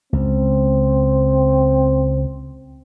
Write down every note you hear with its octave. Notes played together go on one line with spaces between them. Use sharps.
C#2 C4